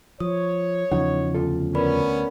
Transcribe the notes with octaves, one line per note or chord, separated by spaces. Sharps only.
F3 C#5 D#6
E2 C#3 E3 F3 D#4 F#5
D2 F4 A4
B3 C#4 A#4 D5 B5